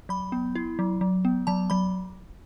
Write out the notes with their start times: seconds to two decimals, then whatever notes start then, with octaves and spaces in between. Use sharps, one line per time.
0.09 F#3 B5
0.32 B3
0.55 E4
0.79 F#3
1.01 F#3
1.25 B3
1.47 F#3 A5
1.70 F#3 B5